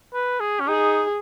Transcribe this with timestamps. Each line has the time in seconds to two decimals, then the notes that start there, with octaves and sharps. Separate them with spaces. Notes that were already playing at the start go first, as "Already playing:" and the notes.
0.14 B4
0.40 G#4
0.60 C#4
0.67 D#4 G#4